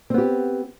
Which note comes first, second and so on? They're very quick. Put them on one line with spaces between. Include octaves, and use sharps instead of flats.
C4 B3 G4